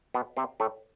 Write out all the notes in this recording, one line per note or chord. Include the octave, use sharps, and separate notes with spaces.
B2 B3
C3 C4
A2 A3